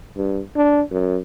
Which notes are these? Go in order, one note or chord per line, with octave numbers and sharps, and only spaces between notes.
G2
D4
F#2